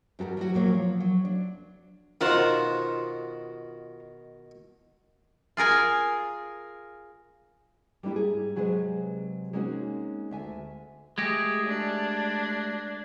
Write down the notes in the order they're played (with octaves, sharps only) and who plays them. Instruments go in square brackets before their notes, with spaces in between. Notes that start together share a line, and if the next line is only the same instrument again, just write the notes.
[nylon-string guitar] G2 F#4 A4 A#4
F#3 G3 F#4
A#2 F#3 A#3 C#5
F3
F#3
D4
[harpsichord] B2 D#3 [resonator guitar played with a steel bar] F4 F#4 C5
[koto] F4 G#4 A#4 G#5
[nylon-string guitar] G3 A#3 D4 E4 G4
G#2 G#4
C3 F#3 G#3 G#4 B4 C5
G#3 A#3 C4 C#4 D#4 F#4
D2 E5 G#5
[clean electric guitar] G#3 A3 G4 [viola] G#4 [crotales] G#6 A#6
[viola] D4